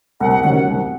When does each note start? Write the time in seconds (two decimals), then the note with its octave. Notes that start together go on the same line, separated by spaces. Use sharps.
0.20 C2 F#5
0.31 F#5
0.43 C3 D#3 F#3 C#4 F#5
0.54 F#5
0.66 C2